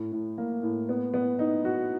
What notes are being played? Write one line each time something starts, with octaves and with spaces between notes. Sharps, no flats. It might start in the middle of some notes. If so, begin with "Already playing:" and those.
Already playing: A2
A2
A#3
A2
B3
B3
D#4
F#4